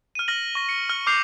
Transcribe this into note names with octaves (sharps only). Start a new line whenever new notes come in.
F6 D#7
F6 A#6 F#7
C#6 A#6 G7
C#7
F6 F#7
C#6 D6 F6 G6 C7 F7